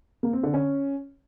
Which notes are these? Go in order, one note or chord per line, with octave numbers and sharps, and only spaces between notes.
A#3
C4
D3
C#4